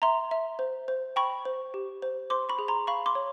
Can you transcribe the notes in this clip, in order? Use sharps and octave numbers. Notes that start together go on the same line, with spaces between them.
E5 A#5 C6
E5
C5
C5
G5 B5 C#6
C5
G4
C5
C5 C6 D6
B5 C#6
G#4
A#5 C6
F5 B5 C#6
C6 D6
C#5